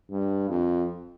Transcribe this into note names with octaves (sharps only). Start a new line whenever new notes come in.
G2
F2